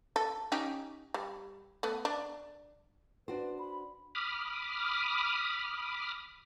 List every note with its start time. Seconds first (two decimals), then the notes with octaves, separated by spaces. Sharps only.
0.16 A4
0.52 C#4 D#4 G4
1.14 G3
1.83 A3 B3
2.05 D4
3.28 D4 F#4 B4 C5
3.59 B5
4.15 B5 D6 D#6 F6